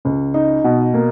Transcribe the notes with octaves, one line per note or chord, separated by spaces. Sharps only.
C#2
D#4
B2
A#3